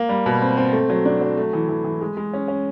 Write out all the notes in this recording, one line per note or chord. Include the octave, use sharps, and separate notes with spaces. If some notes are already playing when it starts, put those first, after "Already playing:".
Already playing: A#3
G3
B2
C4
C4
A3
F#3
D4
F#3
A3
E3
E3
E3
G#3
G#3
C#4
C#4